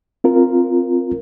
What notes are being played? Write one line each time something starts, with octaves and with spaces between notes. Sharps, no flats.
C4 F4 A#4